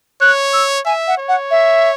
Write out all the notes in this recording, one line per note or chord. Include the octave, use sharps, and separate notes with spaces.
C#5 F#6
E6
E5 G#5
F#5
C#5
F#5
E5